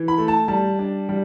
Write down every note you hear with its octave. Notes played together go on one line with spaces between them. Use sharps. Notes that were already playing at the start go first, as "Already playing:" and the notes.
Already playing: E3
B5
A3
A5
G3 A5
D4
G3